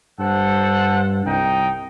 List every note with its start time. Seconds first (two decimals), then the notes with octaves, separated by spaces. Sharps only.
0.19 G2 A4 C5 F#5
1.26 C2 D#4 G5